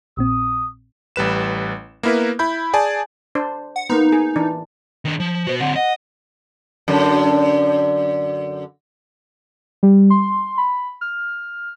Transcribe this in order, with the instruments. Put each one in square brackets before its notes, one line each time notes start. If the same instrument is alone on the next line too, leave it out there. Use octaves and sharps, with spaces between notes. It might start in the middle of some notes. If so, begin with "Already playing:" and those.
[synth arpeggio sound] A#1 A#2 C4 [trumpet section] D#6
[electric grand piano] A1 G3 B4 E7
A#3 B3 E4 A#4 B4
E4 B5 G6
G#4 D5 G#5 A5
[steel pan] D4 C5
[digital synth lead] F#5
[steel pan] A#3 B3 [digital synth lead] D#4
[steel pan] G#4
E3 D4
[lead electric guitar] D#3 D4
F3
[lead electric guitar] F#4 B4 [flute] C5
[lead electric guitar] D3 C4 [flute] F#5
[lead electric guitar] D#5 [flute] F#5
[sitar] F#2 D3
[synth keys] G3
C6
B5
F6